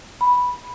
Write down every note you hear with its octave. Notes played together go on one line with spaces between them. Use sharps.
B5